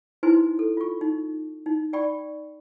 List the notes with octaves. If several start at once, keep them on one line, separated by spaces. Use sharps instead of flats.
D#4 E4 B4 C5 G#5 C6
A4
F4 C#6
D#4
D#4
D5 G5 B5 C#6